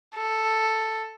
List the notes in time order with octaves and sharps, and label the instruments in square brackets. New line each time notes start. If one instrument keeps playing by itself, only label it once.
[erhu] A4